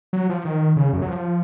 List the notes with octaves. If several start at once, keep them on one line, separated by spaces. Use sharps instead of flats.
F#3
F3
D#3
C#3
F#2
F#3
F3